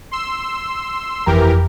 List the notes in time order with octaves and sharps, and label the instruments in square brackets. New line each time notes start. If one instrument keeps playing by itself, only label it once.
[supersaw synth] C6 E6
[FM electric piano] G1 F2 A#5 [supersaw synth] E3 G4 A#4